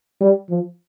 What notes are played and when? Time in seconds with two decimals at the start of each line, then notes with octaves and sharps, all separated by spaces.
0.21 G3
0.50 F3